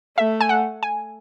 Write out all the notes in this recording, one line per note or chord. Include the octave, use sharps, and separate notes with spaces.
A3 E5
G#5
F#5
G#5